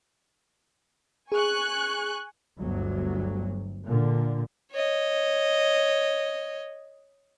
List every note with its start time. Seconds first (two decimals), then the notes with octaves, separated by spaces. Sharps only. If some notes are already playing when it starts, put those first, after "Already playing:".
1.32 G#4 G#5 C#6 F#6
2.59 G1 D2 F#3
3.85 A#2 D3
4.71 C#5 D#5